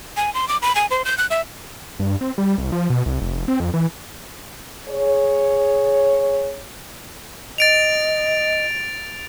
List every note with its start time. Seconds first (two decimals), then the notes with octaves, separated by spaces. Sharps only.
0.17 G#5
0.34 C6
0.48 D6
0.62 B5
0.75 G#5
0.91 C5
1.05 G6
1.18 F#6
1.30 E5
1.99 G2
2.21 C4
2.38 G3
2.58 C2
2.72 F3
2.90 B2
3.06 C2
3.21 F1
3.48 C4
3.60 F2
3.74 E3
4.90 G#4 C#5
7.58 D#5 A6 D7 F7